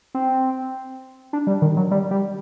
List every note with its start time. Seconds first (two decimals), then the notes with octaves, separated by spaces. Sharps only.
0.14 C4
1.33 D4
1.47 G3
1.62 D#3
1.77 F#3
1.91 G3
2.11 G3